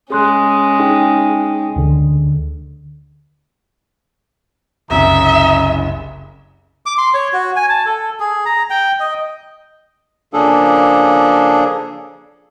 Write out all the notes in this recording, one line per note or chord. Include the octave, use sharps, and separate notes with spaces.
G#3 C#4 G#4 C6 F#6
D#4 G#4 G5
D2 D3
F#1 C2 C#3 D#4 E5
D6
C6
C#5
F#4
G#5
A5
A4
G#4
A#5
G5
D#5
C#3 F3 A#3 D4 G#4 A4